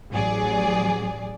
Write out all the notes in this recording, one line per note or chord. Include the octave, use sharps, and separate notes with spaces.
A1 F#3 G#4 D5